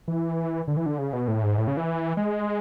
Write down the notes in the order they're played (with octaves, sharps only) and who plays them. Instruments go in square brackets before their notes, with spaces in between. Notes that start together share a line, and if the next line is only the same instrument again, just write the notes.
[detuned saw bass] E3
D3
E3
D3
C#3
B2
A2
G#2
A2
C#3
E3
G#3